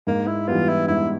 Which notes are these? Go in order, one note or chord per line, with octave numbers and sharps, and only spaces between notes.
G#2 A#3
E4
E3 G3 B3 F4
E4
G#2 E4